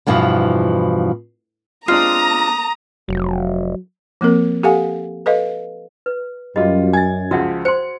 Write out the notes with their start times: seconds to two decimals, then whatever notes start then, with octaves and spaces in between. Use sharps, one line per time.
0.07 E2 G2 B2 E3 F3
1.88 G#3 C4 D4 F4 A#5 D#6
3.09 F1 F#3
4.21 F3 A#3 C4 A#4
4.63 G4 A4 F5 F#5 G#5
5.26 A4 B4 D#5 F5
6.06 B4
6.56 F#2 G3 F4 F#4 D#5
6.93 G#5 G#6 A6
7.31 C#2 F3 F#4 E5 F#5
7.65 C5 C6 C#7